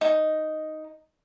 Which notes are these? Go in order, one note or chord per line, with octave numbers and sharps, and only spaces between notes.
D#4